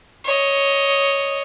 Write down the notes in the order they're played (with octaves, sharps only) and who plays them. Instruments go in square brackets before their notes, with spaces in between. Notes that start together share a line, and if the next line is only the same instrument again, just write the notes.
[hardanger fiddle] C#5 D#5